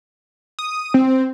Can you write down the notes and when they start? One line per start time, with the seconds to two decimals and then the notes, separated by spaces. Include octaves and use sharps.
0.59 D#6
0.94 C4